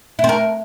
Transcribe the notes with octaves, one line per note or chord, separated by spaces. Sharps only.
E4
C4
A#4